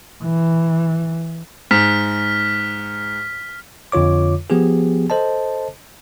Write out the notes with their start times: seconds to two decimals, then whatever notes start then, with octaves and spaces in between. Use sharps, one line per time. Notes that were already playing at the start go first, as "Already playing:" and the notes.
0.23 E3
1.71 G#2 F6 B6
3.92 F2 D3 F4 C#5 D6
4.50 F3 B3 G4 G#4
5.10 A4 C5 D#5 A5